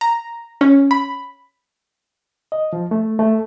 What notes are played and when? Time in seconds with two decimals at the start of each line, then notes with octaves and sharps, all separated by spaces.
0.01 A#5
0.61 C#4
0.91 B5
2.52 D#5
2.73 F3
2.91 A3
3.19 A3